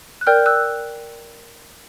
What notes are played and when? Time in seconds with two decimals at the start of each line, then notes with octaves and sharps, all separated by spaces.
0.21 F#6
0.27 A#4 D5 G5 F6 G6
0.46 E6 F#6